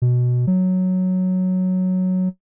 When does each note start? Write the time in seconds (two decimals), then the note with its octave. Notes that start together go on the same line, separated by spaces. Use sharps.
0.02 B2
0.47 F#3